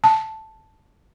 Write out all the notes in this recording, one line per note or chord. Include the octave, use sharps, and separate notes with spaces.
A5